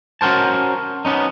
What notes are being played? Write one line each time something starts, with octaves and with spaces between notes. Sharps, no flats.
C#4 F#4 A#4 C5 A5
B3 C#4 D#4